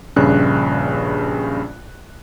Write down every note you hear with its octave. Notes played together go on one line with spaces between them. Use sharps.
A#1 G2 C#3 F#6